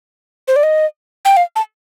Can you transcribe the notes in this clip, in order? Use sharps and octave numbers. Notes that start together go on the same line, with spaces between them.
C5
D5
D#5
G5
F5
A5